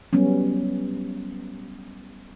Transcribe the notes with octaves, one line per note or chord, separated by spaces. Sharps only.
F#3 G3 B3 C#4